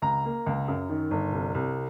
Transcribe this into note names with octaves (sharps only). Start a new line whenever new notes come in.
C#2 A#5
A#3
C#2
F#2
D#3
G1
C2
C2